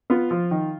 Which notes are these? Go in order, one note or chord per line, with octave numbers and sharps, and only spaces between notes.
B3 F4
F3
D#3